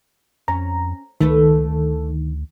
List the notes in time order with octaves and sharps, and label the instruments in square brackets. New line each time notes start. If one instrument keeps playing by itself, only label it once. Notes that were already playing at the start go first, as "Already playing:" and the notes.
[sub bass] F2 [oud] C#4 [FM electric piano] A#5
[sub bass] C#2 [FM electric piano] D#3 [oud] A3 A4 B4
[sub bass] D2